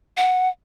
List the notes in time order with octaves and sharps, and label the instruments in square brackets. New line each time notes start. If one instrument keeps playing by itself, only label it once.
[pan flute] F#5